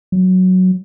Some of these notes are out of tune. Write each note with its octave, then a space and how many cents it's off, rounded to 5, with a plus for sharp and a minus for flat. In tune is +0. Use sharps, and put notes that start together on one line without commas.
F#3 +0